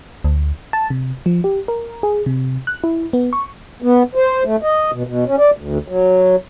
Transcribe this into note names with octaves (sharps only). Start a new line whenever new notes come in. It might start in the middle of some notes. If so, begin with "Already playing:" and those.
D2
A5
C3
F3
G4
A#4
G#4
C3
F#6
E4
B3
C#6
B3
C5
A3
D#5
B2
B2
C#4
D5
D2
F#3